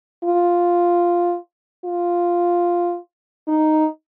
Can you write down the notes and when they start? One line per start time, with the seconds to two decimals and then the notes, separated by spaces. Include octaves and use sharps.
0.24 F4
1.85 F4
3.48 D#4